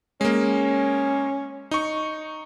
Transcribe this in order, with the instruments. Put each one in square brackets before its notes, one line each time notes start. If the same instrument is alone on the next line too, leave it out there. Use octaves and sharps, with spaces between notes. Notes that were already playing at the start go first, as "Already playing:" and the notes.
[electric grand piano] G#3 A#3 [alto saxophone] C#4
[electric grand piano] D#4 C#6